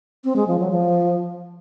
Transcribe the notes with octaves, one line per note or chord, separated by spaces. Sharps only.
C4
G#3
F3
F#3
F3